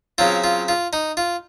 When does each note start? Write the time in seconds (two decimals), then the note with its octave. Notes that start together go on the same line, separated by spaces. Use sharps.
0.18 C#3 F#3 C4 F4
0.44 F4
0.68 F4
0.93 D#4
1.17 F4